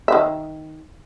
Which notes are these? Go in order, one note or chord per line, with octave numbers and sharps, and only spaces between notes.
D#3 E5